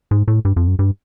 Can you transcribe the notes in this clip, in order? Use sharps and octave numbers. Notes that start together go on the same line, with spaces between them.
G#2
A2
G2
F2
F#2
G2